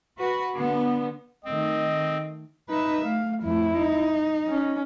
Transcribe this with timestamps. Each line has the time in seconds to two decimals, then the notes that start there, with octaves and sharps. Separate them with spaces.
0.19 F#4 B4
0.56 D3 B3
1.45 D#3 A3 C4 D#5
2.70 D#4 B4 E5
3.04 A3 F5
3.42 F2 A3 E4
3.79 D#4
4.48 C#4